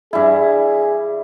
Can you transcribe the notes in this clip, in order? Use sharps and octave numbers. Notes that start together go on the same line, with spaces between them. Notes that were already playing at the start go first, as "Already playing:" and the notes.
G2 E4 G#4